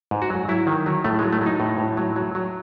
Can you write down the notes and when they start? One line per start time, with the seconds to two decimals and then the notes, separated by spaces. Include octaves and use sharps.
0.11 G#2
0.22 F#4
0.30 F#3
0.49 F#3 E4
0.67 D#3
0.86 F#3
1.04 A2 A3
1.19 G#3
1.23 F#3
1.33 A3
1.41 F#3
1.46 D#4
1.60 A2
1.78 A2
1.97 F#3
2.16 F#3
2.35 F#3